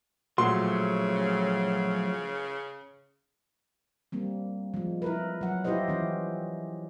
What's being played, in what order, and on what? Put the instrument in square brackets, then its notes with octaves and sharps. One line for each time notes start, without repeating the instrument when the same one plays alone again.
[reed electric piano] A#2 F#4 [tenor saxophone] C#3 [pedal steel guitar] F3 F#3 A3 [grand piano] C6
[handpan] G3 A#3 C4
F3 G#3
E4 A#4 B4
F#3 F#5
E4 F4 G4 B4 C5 D#5
E3 C#4 E4